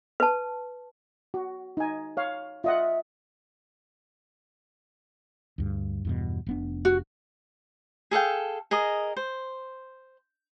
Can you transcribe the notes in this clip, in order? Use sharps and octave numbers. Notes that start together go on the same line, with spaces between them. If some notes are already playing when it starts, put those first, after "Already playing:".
B4 A5
F#4
D#4 G#5
C#5 F5
F4 D#5 E5 F#5
D2 G2
E2 G2 B2
F1 B3 D4
F#4
G#4 A4 F5 G5
G#4 A#4 D#5
C5